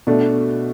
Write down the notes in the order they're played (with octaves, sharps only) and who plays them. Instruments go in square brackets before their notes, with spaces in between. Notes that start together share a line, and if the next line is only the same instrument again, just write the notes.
[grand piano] B2 A3 D4